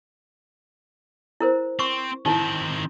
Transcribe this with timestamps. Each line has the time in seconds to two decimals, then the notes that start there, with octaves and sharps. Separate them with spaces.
1.40 E4 A#4 C5
1.79 C4 C#6
2.26 D#3 C4 D#4 E4